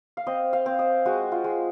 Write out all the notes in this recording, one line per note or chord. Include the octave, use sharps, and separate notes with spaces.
F5
C4 D#5
F5
C4
D#5
G#3 F#4
F4
G#3